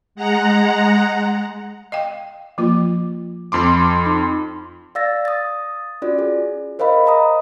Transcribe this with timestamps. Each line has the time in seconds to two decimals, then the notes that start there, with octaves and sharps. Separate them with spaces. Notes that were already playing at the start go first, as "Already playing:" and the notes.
0.15 G#3 F#5 A#5
1.92 D#5 F5 G5
2.58 F3 A#3 F4
3.52 F2 C6 D6
4.05 D#4
4.95 D5 F5 E6 A6 A#6
5.25 D#6 A6
6.02 C#4 F4 F#4 D5
6.19 G#4
6.79 A#4 C5 D#5 F5 B5
7.06 D#5 A#5 D#6